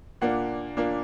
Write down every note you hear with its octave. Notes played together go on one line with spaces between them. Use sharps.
A#2 A#3 D4 F#5
A#2 A#3 D4